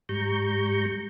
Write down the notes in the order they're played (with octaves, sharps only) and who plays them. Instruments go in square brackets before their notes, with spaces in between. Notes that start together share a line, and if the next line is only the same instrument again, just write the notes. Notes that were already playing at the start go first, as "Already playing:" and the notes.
[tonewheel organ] G#2 G3 A#5 C#6 G6